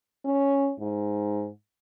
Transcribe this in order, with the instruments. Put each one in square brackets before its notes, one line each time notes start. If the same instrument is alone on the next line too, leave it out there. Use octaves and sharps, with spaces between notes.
[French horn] C#4
G#2